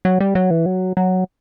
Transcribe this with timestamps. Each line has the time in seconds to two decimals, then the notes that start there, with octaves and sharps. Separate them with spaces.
0.05 F#3
0.20 G3
0.35 F#3
0.51 E3
0.66 F#3
0.97 F#3